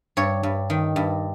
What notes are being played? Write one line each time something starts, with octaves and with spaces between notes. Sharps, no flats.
G2 C#5
G2
D#3
G2